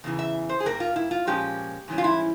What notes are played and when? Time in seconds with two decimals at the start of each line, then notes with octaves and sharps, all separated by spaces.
0.04 E2 C#3 E3
0.19 E5
0.49 C5
0.60 G#4
0.66 G2 G3 A#3 A#4
0.80 F4
0.96 E4
1.11 F4
1.27 A#2 F3 G#3 C#4 G4
1.88 G#2 E3 G3 C#4
1.98 F4
2.04 E4